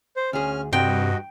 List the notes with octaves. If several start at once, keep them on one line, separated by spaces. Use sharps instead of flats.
C5
D2 C#4 G#4 F6
G2 C3 F#4 D#5 G5